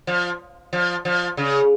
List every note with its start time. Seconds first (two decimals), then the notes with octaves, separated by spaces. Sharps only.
0.07 F3
0.73 F3
1.05 F3
1.37 C#3